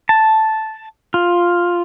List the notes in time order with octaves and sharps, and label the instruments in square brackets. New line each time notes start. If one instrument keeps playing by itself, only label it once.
[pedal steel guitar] A5
F4